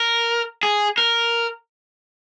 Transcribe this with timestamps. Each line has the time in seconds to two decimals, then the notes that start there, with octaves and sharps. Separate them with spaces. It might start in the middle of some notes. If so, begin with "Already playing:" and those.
Already playing: A#4
0.63 G#4
0.98 A#4